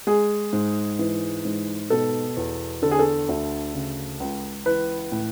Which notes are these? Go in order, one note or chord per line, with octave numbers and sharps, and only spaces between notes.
G#3 G#4
G#2
E3
G#2
B2 A4
E2
D3 A4
G#4
A4
D2
C#3
C#2
E3 B4
A2